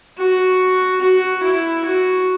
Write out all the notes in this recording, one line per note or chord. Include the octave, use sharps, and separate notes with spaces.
F#4
F#4
E4
F#4